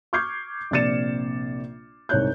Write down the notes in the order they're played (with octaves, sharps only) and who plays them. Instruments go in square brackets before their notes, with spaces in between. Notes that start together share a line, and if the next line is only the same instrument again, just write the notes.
[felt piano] C#6 D6 F6 G6 G#6 C7
A#1 C3 D5 A6 C#7 E7
C2 G#2 C#5 F#6 G6